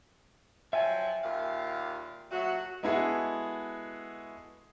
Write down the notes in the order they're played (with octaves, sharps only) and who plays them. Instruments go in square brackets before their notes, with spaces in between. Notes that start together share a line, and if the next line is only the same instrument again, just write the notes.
[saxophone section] F3 F#3 [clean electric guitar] E5 G5 G#5
[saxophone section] D#2 A#2 F5
[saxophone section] A#2 F#3 A3 [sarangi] F#4
[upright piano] G#3 B3 E4 F#4 G#4 A4